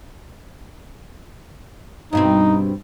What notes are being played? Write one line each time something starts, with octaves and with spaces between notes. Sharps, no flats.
G2 B2 C4 D#4